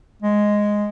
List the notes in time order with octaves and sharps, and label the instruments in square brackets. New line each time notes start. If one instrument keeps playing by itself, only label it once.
[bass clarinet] G#3